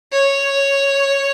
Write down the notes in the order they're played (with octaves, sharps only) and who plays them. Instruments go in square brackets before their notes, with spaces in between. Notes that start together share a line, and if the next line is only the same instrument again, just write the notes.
[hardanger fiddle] C#5